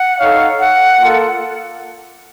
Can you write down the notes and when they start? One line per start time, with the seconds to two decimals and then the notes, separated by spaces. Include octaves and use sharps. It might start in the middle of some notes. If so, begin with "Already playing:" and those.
Already playing: F#5
0.19 D#4 A4 C#5 F5
0.59 F#5
1.00 A#3 F4 A4